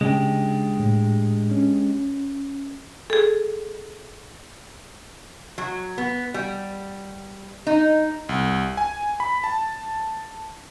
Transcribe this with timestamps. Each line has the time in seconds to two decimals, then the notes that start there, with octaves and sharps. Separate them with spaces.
0.01 C#3 G#3 D4 G4
0.80 A2
1.51 C#4
3.10 G#4 A4
5.58 F#3
5.98 B3
6.34 G3
7.67 D#4
8.29 C2
8.77 G#5
9.20 B5
9.44 A5